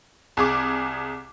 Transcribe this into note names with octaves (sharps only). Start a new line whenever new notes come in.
C2 G#4 D6